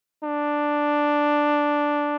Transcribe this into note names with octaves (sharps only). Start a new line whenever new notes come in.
D4